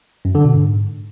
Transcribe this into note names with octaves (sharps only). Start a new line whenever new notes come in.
F#2
D3
B2
G#2